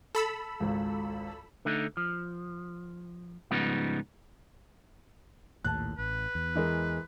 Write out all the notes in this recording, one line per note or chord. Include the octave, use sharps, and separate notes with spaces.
A4 B5 E6
G#1 C#2
D3 A3 D#4
F3
G#2 C#3 F3 G3 B3 D#4
A#1 D#2 A2 A5 F#6
A1 B4
E2
E3 G#3 A#4